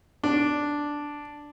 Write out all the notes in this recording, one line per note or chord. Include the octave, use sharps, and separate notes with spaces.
D4